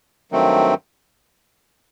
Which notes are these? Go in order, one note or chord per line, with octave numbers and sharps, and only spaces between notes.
G2 D#3 F#3 A3 C4